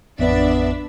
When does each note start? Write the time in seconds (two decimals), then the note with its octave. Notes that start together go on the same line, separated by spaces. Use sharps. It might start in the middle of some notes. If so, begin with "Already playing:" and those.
0.19 A1 F2 B3 D4 D5 E5